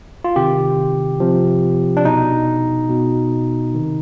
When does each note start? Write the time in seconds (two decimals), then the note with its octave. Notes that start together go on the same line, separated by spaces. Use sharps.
0.24 F4
0.36 C3 D#3 G4
1.20 C3 F3
1.97 D4
2.05 B2 D#4
2.89 B2
3.74 C3 D#3